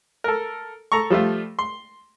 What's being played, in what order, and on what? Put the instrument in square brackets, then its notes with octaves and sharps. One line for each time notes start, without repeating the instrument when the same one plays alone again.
[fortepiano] A4 A#4
A4 A#5 C#6
F3 G3 A3 F4
C6